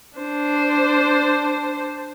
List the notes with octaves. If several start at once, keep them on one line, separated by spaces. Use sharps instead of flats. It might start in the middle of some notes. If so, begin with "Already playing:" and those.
D4 C5